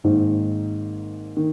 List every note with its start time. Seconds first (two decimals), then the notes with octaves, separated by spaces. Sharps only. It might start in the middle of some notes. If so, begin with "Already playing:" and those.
0.04 G#1 G#2 D#3 A#3 D#4
1.37 D#3